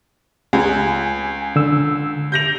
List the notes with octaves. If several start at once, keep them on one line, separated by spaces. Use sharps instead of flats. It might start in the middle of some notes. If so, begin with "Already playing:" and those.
C#2 G#5
D3 E6
G6 A#6 F7